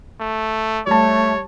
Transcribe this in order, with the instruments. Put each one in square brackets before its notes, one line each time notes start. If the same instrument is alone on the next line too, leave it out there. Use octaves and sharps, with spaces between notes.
[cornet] A3
[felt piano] G3 A5 [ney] A3 [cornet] C#5